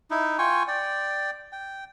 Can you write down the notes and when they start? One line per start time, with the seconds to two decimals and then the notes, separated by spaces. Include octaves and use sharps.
0.11 D#4 E4
0.38 F4 G5 G#5 C#6
0.68 D5 G5
1.52 G5